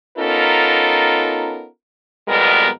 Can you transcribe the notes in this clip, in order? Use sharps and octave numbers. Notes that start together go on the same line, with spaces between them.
B3 C#4 D#4 F4 A4 A#4
F2 B2 G3 G#3 B3 A#4